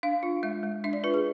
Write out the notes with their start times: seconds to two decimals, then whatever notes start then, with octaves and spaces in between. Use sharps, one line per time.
0.03 D4 F5
0.23 F4
0.43 G#3 E5
0.63 G#3
0.84 D4 E5
0.93 D5
1.04 F4 B4
1.14 G#4